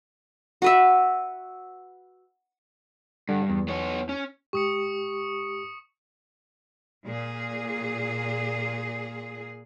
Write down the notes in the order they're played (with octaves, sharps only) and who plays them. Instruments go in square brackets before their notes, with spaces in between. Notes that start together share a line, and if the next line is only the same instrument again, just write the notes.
[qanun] F#4 B4 E5
[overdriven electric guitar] G2 [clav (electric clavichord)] D3
[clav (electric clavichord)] E2
[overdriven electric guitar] B3 C#5
C#4
[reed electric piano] G#2 G4 [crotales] C#6 D#6 C#7
[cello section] A#2 G#4